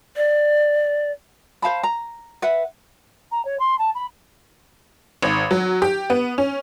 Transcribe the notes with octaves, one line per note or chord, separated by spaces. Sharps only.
D5
C5 F5 A5 B5
A#5
B4 E5 F#5
A#5
C#5
C6
A5
B5
G#1
F#3
G4
B3
C#4